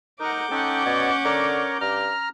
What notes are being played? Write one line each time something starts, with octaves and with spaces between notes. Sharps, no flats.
D#4 A#4 F#5 D6 G6
C#4 D#4 A4 F#5 G5
B2 B3 C#5 D5
D3 A#4 C#5 A#5
G2 A#5 F6